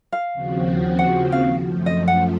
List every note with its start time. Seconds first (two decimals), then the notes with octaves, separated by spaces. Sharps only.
0.12 F5
0.34 D#2 C#3 F3 C4 F#4
0.99 F#5
1.32 F5
1.65 F#2 F3 A3
1.86 D#5
2.08 F#5